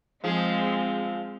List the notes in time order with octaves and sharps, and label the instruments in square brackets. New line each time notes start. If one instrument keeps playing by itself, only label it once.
[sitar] F3 G#4 [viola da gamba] G#3 C4